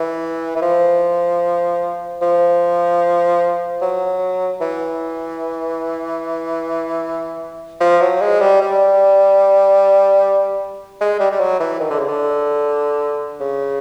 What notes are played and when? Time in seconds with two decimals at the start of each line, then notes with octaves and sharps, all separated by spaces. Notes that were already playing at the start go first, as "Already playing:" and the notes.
Already playing: E3
0.56 E3
0.62 F3
2.22 F3
3.81 F#3
4.61 E3
7.80 F3
8.01 F#3
8.21 G#3
8.40 G3
8.61 G3
11.01 G#3
11.20 G3
11.31 G3
11.40 F#3
11.60 E3
11.80 D#3
11.90 D3
11.99 C#3
12.09 D3
13.40 C#3